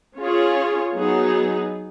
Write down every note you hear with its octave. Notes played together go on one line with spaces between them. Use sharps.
C#4 F4 G#4 C#5
F#3 B3 D#4 G#4